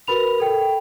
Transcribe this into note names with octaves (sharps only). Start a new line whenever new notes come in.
F#4 A#4 B4 B5 F7
A4 G5